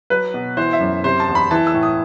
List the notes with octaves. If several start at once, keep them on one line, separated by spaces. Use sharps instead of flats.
F#3 B4
B2
E3 C5
E5
F#2
C3 C5
A5
E2
B5
E3 A5
E6
A2
D#6